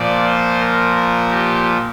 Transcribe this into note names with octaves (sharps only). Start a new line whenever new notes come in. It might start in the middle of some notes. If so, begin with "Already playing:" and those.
Already playing: A#2 F3 D5
C5
A#4
A#4
G4